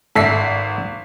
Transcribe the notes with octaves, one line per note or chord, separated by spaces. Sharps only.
G#1 A4 E5 B6 C7